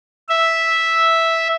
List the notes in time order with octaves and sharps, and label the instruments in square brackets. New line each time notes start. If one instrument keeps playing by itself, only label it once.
[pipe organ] E5